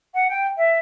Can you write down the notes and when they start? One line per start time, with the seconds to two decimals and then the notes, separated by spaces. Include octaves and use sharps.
0.14 F#5
0.29 G5
0.57 E5